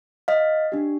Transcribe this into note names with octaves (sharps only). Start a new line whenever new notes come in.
D#5 F5
D4 G4